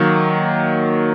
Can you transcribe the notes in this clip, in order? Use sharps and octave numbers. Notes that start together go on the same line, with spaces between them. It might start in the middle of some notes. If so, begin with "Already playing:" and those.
Already playing: D#3 F#3 A#3